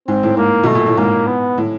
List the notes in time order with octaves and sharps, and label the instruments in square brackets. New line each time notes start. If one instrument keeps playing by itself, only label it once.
[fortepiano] G#2 [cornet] C4
[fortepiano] A2
[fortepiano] G#2 [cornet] A#3
[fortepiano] B2 [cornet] A3
[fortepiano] A#2
A2
[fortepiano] G#2 [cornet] A#3
[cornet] B3
[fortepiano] A2